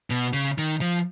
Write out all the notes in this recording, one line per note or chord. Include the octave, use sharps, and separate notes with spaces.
B2
C#3
D#3
F3